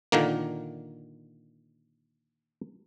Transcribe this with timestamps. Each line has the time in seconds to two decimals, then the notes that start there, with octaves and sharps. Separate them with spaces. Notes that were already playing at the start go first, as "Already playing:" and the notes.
0.12 A#2 D3 D#3 A#3